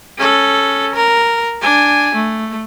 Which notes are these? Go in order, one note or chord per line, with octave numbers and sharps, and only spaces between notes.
C#4 A4
A#4
D4 G#5
A3